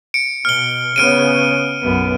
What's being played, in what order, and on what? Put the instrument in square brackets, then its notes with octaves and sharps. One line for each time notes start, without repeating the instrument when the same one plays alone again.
[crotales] C#7 D7
[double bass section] B2 [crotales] F6 G7
[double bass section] C#3 B3 C#4 [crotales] F6 D7 D#7
[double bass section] B1 F#2 B3